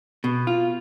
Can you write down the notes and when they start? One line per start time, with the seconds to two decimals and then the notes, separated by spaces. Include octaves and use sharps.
0.24 B2
0.47 F4